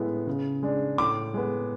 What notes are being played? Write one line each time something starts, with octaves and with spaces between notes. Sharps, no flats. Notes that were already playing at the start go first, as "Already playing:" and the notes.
Already playing: A2 G#3 B3 E4
C#3
G#3 D4
A2 D6
G#3 B3